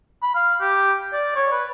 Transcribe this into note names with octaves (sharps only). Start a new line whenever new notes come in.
B5
F5
G4
D5
C#5
B4